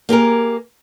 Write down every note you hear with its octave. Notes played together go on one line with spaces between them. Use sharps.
A#3 G4 G#4 A#4